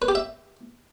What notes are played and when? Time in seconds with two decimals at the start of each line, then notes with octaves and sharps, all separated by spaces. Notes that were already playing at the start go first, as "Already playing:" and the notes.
0.02 B4
0.08 G4
0.15 E5